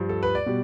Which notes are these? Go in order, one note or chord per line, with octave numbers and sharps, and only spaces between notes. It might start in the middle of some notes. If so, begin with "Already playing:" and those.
Already playing: G2 F3
A4
B4
D5
B2 G3